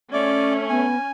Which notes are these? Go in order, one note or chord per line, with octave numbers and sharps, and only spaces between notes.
A3 C#4 D5
B3 G#5